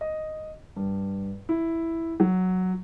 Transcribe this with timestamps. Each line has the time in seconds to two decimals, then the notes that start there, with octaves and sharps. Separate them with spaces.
0.01 D#5
0.76 G2
1.49 E4
2.20 F#3